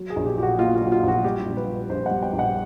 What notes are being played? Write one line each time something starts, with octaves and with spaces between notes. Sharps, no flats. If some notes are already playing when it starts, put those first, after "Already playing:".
Already playing: F#3
G#4
A#1
G4
A#2 G4
F#4
A#3 F4
F4
F#3 F#4
F4
A#1 F#4
G3 G4
A#1
B4
A#2
A#1 C5
F#5
G3
G5
A#1
F#5